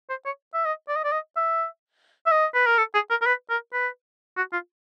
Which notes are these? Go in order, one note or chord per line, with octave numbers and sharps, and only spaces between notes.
C5
C#5
E5
D#5
D5
D#5
D5
D#5
E5
E5
D#5
B4
A#4
A4
G#4
A#4
A#4
B4
A#4
B4
F#4
F4